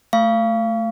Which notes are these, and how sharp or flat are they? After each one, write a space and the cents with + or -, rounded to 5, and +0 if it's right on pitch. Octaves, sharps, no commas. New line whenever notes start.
A3 +5 F5 -25 C#6 +35